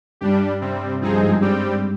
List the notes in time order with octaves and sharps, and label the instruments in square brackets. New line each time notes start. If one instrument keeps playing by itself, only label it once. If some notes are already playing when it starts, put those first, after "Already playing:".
[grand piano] G2 [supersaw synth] G3 D4 G4
[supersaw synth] C3 G3 C4
[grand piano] G2 [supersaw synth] F3 C4 D#4 G#4
[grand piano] G2
G#2
G2
[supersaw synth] G3 C4 G4